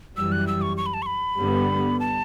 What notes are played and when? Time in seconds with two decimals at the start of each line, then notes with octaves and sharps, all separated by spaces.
0.16 F#2 E3 G3 E6
0.32 F#6
0.47 E6
0.62 C#6
0.77 C#6
0.86 B5
0.94 A5
1.02 C#6
1.06 B5
1.38 G2 D3 G3 B3
2.00 A5